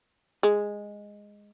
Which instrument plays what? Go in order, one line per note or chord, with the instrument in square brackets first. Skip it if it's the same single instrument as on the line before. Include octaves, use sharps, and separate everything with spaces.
[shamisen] G#3